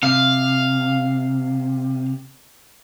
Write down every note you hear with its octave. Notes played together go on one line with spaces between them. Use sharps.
C3 F5